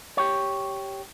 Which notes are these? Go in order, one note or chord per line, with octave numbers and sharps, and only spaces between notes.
G4 C#5